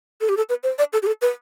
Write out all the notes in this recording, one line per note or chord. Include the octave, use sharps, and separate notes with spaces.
A4
G4
A4
B4
C5
D5
A4
G4
A4
B4